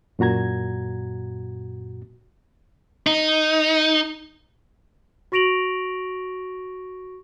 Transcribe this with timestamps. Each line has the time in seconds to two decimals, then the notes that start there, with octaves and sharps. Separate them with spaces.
0.19 F#2 A#2 F#4 A#5 G#6
3.06 D#4
5.32 F#4 C#6 A#6 D7 F7 F#7